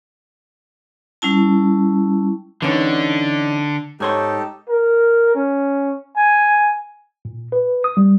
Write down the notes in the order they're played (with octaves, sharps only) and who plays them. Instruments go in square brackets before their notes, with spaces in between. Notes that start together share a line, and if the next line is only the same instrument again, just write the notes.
[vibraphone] G3 C#4 E4 A5
[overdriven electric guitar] D3 [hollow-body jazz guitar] E3 C#4 D#4 [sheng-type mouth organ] D5
[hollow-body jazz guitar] G#2 C#5 C6 [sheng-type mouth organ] D#4 G4 A4
[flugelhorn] A#4
C#4
G#5
[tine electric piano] A#2
B4
D#6
G3